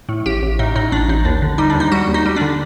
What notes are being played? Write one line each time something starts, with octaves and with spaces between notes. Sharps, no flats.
A2
A1 G4
A1
A2 D#4
A2 D#4
A1 D4
A1 D#4
D#2 D4
D3
G3 D#4
D#2 D4
D#4
G3 F#4
D#2
D#4
G3
D4
D3